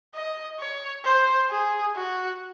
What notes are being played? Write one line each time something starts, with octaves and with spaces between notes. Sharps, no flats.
D#5
C#5
C5
G#4
F#4